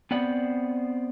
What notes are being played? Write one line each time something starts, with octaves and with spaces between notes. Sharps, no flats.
B3 C4 D5 F#5